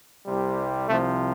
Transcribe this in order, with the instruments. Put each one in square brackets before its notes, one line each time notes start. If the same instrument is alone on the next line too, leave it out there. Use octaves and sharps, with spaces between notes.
[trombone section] C2 C3 G3
C2 C3 F3 A3